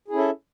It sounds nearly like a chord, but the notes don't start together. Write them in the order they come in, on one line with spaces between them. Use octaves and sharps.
G#4 E4 C#4 A4 E5